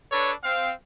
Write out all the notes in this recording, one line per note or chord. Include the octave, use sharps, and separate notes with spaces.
D4 A4 B4 C#5
C4 F5